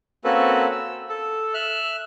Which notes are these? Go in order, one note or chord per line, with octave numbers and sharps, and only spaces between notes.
A#3 C4 C#4 F#4 A4 B4
E6
A4
E5 F6 F#6